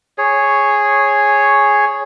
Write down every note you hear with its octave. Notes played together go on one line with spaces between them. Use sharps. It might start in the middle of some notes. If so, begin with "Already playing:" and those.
G#4 C#5